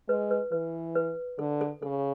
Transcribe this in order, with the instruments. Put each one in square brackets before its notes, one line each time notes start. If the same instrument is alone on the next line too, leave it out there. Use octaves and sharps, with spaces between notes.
[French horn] G#3 [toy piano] B4
[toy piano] B4
[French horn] E3 [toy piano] B4
[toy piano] B4
[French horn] D3 [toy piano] A4
[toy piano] A4
[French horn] C#3 [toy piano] A4